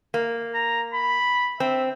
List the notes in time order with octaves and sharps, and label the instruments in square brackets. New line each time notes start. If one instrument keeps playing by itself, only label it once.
[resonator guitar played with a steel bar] A#3
[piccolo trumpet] A#5
B5
[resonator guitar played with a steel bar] C4 [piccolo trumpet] E5